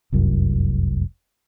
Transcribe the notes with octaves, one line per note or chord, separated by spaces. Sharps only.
F1 C2 F#2